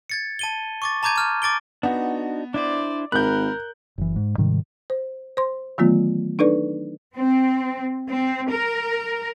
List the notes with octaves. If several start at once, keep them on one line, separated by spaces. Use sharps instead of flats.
G#6 A6 C#7
A5 D#7 G7
C#6 D6 A6
A5 A#5 D6 G6 G#6 D#7
D6 F6 G6
D6 A6 D7 G7
B3 D4 D#4 F#4
D4 E4 C5 D5
G#1 A#4 B5 F#6 G6
F#1 E3
G#2
G#2 C3 D#3 G3
C5
C5 C6
D#3 E3 F#3 A3 B3 F4
D4 D#4 A4 B4 D5
C4
C4
A#4